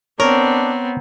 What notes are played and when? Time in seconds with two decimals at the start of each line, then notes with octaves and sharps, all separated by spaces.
0.20 B3 C4 D4 A#4 C#5